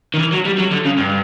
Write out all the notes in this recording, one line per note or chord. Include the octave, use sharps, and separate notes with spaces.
D#3
E3
F#3
G3
F#3
D3
C#3
G2